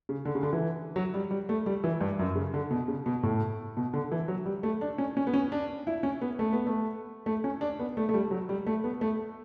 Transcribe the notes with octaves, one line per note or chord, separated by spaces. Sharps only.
C#3
D3
C#3
D3
E3
F#3
G3
G3
A3
G3
E3
G2
F#2
C#3
D3
B2
C#3
B2
A2
B2
D3
E3
F#3
G3
A3
D4
C#4
C#4
B3
C#4
D4
E4
C#4
B3
A3
B3
A3
A3
C#4
D4
B3
A3
A3
G3
F#3
G3
A3
B3
A3